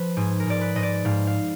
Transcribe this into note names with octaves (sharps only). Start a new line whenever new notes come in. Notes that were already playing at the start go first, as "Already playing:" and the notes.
Already playing: F3 B4
G#2 G#4
A#4
G#2 D5
B4
G#2 D#5
D5
G#2 F5
F5